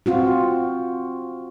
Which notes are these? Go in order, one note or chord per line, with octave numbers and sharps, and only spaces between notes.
C4 F4 F#4